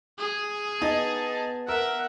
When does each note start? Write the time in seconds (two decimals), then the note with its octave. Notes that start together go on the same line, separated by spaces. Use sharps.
0.18 G#4
0.82 B3 D#4 A5
1.68 A#4 E5 F#5